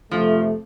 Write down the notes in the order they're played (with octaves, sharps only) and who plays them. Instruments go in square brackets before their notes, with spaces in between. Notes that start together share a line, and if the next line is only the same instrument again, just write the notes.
[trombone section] F2 C3 A3 [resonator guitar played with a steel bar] F3